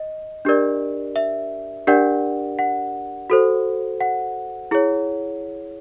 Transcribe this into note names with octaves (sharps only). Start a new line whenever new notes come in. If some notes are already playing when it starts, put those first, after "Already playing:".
Already playing: D#5
D4 G4 A#4 D5
E5
D4 G4 A#4 D5 F#5
F#5
F#4 A4 C5
F#5
E4 G#4 C#5